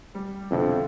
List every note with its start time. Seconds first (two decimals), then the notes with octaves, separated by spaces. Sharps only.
0.15 G3
0.51 F2 B2 D3 E4